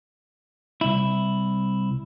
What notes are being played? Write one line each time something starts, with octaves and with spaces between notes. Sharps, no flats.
C2 E4